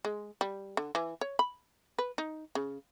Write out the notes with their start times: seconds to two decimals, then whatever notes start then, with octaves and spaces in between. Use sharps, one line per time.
0.05 G#3
0.41 G3
0.77 D3
0.95 E3
1.21 C#5
1.39 B5
1.99 B4
2.18 D#4
2.55 C#3